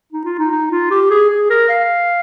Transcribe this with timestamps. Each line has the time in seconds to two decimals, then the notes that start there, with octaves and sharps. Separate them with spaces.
0.12 D#4
0.25 F4
0.39 D#4
0.51 D#4
0.71 F4
0.91 G4
1.11 G#4
1.30 G#4
1.50 A#4
1.69 F5